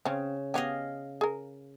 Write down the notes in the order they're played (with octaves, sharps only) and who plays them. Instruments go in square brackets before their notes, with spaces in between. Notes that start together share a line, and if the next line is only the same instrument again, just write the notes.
[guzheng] C#3 [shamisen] C4 C#4
[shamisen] B3 G4 [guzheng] D#5 F5 G#5
[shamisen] G#4 A#4